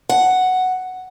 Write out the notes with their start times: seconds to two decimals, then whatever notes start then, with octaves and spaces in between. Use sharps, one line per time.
0.09 F#5